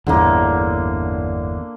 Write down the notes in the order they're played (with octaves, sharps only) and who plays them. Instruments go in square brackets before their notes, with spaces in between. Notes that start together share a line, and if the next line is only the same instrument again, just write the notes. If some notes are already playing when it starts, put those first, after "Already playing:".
[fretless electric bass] G1 E2 A2 [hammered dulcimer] D3 A#3